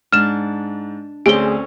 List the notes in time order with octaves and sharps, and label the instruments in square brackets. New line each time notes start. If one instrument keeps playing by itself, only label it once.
[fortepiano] G#2 [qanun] D4 [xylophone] F6 E7
[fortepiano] D2 [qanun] C4 C#4 [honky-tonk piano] G#4 [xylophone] D7 G7